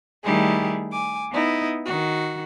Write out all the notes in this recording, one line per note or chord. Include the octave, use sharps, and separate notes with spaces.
D#3 G3 A3 E4 G4 G#4
G#5 D6
B3 D#4 E4
D#3 F#4